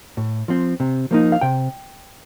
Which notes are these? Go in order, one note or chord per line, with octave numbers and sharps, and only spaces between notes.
A2
F3 C4
C3
F3 A#3 D#4
F5
C3 G5